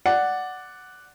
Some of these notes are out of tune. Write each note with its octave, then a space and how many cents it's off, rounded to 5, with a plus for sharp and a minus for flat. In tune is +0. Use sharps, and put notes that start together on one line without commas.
D5 +0 F#5 +0